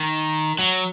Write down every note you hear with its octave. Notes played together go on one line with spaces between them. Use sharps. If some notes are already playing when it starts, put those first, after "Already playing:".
Already playing: D#3
F#3